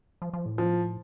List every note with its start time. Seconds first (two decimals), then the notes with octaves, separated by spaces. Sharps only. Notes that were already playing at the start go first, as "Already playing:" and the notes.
0.22 F3
0.33 F3
0.46 A2
0.58 F3